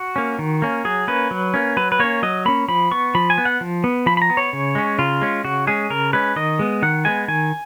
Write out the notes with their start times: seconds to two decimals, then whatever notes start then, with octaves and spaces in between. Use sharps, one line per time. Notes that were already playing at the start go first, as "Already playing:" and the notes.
Already playing: F#4
0.16 A#3 C#4
0.39 D#3
0.62 A#3 C#4
0.85 F#3 G#4
1.08 A#3 C#4 B4
1.31 F#3
1.54 A#3 C#4
1.77 F#3 B4
1.92 B4
1.99 A#3 C#4 C#5
2.23 F#3 D#5
2.45 A#3 C#4 B5
2.68 F3 B5
2.91 B3 C#6
3.15 F3 B5
3.30 G#5
3.38 B3
3.45 F#5
3.61 F3
3.84 B3
4.06 F3 B5
4.17 B5
4.22 A#5
4.30 B3
4.37 C#5
4.53 C#3
4.75 G#3 C#4
4.99 C#3 F4
5.21 G#3 C#4
5.44 C#3 F#4
5.67 G#3 C#4 G#4
5.90 C#3 A#4
6.13 G#3 C#4 B4
6.36 D#3 D#5
6.59 G#3 B3
6.82 D#3 F#5
7.05 G#3 B3 G#5
7.28 D#3 G#5